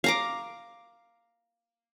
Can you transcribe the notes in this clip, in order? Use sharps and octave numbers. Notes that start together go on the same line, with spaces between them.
F5 A#5 D6